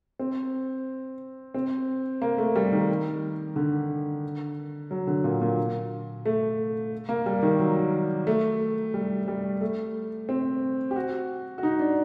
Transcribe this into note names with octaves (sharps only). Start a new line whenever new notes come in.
C4
C4
A#3
A3
G3
D#3
D3
F#3
D3
A#2
A#2
A3
A#3
G3
D#3
F#3
A3
G3
G3
A3
C4
G4
F#4
F#4
D#4
D4